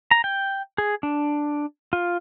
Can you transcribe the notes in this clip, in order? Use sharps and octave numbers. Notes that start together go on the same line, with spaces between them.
A#5
G5
G#4
D4
F4